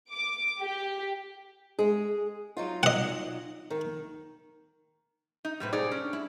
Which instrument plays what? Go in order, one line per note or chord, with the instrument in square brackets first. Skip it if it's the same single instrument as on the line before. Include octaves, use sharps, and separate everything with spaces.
[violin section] D6
G4
[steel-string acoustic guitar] G#3 G#4
F#3 D#4 F4
[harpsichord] D#5 F#5
[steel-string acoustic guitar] D#3
[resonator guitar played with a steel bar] D#4
[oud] F#2 A2 C3 [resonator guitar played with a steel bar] G3 B4
[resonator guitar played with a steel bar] D#4 G#4 D5
[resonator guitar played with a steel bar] C#4 [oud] D4
[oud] E4